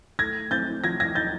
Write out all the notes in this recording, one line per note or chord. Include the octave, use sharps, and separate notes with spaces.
A3 G#6 A#6
C4 G6 A6
F3 G#6 A#6
G#6 A#6
D#4 G6 A6